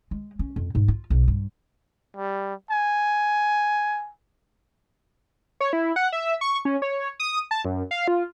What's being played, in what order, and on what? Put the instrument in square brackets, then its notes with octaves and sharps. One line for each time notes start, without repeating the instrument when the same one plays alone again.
[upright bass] G#3
C#4
F2
G#2
F4
B1
G2
[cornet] G3
G#5
[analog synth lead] C#5
E4
F#5
E5
C#6
C#4
C#5
D#6
A5
F#2
F5
F4